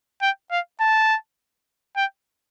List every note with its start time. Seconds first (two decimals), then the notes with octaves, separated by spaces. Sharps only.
0.22 G5
0.51 F5
0.81 A5
1.96 G5